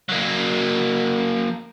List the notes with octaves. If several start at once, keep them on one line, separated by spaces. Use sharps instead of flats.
F#3 A#3